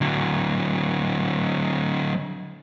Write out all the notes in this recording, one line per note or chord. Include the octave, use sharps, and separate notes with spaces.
D3 F#3